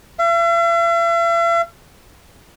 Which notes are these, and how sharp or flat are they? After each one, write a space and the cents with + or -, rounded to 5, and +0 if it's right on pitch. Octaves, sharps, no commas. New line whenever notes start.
E5 +45